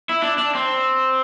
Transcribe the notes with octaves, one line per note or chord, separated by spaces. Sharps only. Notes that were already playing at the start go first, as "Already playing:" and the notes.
E4
D4
D4
C4